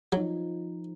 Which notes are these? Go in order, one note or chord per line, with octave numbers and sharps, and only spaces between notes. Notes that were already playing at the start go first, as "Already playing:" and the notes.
F3 F#3 D#4